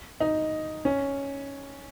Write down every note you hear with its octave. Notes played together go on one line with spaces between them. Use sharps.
D#4
C#4